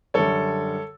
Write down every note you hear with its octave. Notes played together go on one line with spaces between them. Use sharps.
F#2 D3 G3 A4 C#5